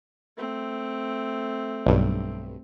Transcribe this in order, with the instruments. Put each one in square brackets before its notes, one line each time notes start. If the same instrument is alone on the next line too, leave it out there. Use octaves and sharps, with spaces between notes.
[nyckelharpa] A3 C4
[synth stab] B1 G2